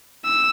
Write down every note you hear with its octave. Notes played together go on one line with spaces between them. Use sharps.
E6